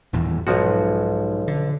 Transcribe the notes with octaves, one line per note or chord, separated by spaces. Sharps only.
D#1 E2 A2
B1 G#2 F3 F#4
D3